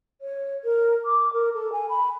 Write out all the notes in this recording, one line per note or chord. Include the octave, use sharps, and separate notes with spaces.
C#5
A#4
D6
A#4
A4
G#5
B5